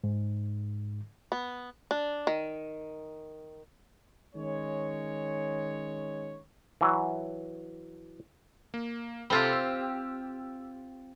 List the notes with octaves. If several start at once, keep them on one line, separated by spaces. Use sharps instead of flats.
G#2
B3
D4
D#3
D#3 G#3 C#4 C#5
E3 F#3
A#3
C3 C4 F4 G4 A4 B5
E6